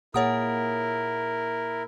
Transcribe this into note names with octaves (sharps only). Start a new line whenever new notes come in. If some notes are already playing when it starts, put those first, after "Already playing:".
A#2 A#3 E4 G#4 A#4 C#5 F#5 D#6